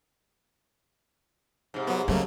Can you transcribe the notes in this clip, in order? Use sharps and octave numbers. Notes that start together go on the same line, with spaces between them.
G#2 C3
F#3 B3
C#3 F#3 A3 A#3